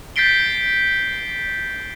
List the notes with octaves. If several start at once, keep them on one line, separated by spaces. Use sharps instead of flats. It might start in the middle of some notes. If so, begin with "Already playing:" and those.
G6 A6 B6 C7 D7 G7